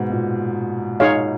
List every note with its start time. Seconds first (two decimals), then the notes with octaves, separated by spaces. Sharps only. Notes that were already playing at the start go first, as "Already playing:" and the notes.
Already playing: G#2 B2
0.10 A#2
1.00 D#4 G#4 C#5 F5